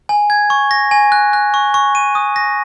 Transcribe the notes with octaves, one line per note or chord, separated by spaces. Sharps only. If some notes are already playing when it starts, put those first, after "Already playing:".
G#5
G#6
C#6
A#6
G#5
F#6
F#6
C#6
C#6
D#7
D#6
A#6